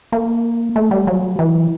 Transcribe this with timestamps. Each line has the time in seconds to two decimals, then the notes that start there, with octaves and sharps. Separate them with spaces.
0.12 A#3
0.76 A3
0.91 G3
1.07 F#3
1.39 E3